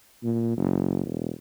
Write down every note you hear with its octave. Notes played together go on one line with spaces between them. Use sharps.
A#2
F#1
E1